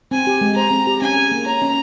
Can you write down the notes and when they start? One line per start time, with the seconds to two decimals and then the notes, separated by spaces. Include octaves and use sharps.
0.11 C4 G#5
0.27 G4
0.41 G#3
0.57 C5 A#5
0.71 C4
0.87 G4
1.02 C#4 G#5
1.17 G#4
1.32 A#3
1.46 C#5 A#5
1.62 C#4